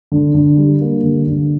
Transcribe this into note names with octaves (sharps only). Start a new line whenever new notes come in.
D3
D3
G3
A#3
D3
D3